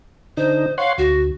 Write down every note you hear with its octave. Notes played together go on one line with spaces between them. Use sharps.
D3 D#4 C5
C#5 F5 F#5 C6
D2 F#4